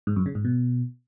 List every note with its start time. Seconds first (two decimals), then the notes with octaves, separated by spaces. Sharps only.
0.07 G#2
0.16 F#2
0.26 C#3
0.35 G#2
0.45 B2